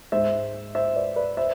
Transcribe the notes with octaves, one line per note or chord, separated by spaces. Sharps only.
G#2 G#3 C5 E5
C5 E5
B4 D5
B4 D5
C5 E5